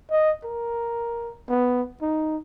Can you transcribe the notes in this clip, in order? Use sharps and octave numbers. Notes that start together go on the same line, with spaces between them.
D#5
A#4
B3
D#4